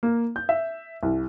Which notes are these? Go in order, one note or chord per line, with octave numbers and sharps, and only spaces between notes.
A#3
G6
E5
C2